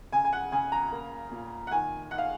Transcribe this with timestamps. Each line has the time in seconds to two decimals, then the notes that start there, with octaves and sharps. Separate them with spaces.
0.12 C#3 G#5
0.24 G#5
0.33 F#5
0.52 C#3 G#5
0.72 A#5
0.92 A#3
1.31 A#2
1.67 F#5
1.71 D#3 G#5
2.11 D#4 F#5
2.18 F5